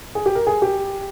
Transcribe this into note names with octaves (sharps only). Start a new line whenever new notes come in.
G#4
G4
A#4
G#4
G4